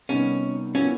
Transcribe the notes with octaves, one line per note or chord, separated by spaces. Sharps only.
C3 D#3 G3 B3 C#4 D#4
A#2 F#3 B3 C#4 E4